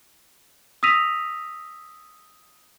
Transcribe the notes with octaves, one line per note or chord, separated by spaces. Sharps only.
D#6 E6 A#6 B6 D#7 F7